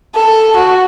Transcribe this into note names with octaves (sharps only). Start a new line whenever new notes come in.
A4
F#4